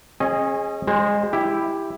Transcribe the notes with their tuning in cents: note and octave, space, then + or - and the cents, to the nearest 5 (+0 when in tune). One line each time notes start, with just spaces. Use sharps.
C#4 -35 G#4 +0 D#5 +0
G#3 -20 C5 +20
E4 +0 G4 +10